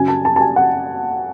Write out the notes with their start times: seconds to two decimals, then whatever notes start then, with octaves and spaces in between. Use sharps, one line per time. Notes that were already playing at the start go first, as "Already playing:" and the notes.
Already playing: F#2 C#3 G#5
0.08 A5
0.25 A5
0.36 A5
0.41 G#5
0.56 F#5